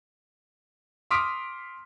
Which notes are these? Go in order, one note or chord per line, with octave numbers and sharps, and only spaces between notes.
C6 D6 D#6 F6 B6 D7